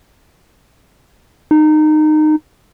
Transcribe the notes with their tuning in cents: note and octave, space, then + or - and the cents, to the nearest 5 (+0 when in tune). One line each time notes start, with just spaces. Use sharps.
D#4 -20